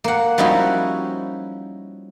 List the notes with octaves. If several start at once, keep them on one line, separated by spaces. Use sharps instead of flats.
A#3 F#5
F3 G3 C#4 D#4 E4 F#4